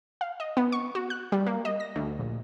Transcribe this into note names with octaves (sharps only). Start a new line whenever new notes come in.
F5
D#5
B3
C#6
F#4
F#6
G3
A#3
D#5
A#6
D2
A#1